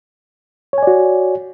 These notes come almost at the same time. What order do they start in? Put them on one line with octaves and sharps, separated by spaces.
C#5 G#5 D5 F#4